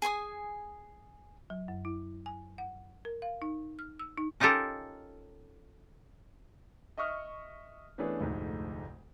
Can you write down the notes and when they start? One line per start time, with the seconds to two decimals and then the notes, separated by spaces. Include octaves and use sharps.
0.02 G#4 G#5 C6 D#6
1.50 F#3
1.68 F#2
1.85 E4
2.26 G#5
2.58 F#5
3.05 A#4
3.22 F5
3.42 D#4
3.79 F6
3.99 E6
4.18 D#4
4.40 C#4 D#4 F4 G4 A4 A#4
6.98 D#5 E5 C#6 D#6 F6
7.98 E3 A3 B3 C#4 D4 G#4
8.20 F1 D2 G#2